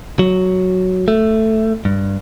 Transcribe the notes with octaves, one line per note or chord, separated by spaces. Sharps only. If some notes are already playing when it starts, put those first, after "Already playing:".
F#3
A3
G2